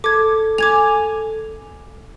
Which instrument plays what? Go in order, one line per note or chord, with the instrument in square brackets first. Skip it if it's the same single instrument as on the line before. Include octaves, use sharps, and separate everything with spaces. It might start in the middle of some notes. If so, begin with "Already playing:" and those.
[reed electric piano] A4 [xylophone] D6 G#6
[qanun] G#5 [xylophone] D6 G#6 F7